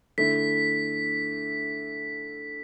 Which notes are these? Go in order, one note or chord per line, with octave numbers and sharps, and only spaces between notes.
D3 A3 E4 B6